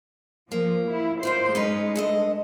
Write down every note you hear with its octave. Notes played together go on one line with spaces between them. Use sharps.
F3 A#3
E4
D#2 F4 C5 D5
G#3 C#4 D#4 B4
G2 A3 D#5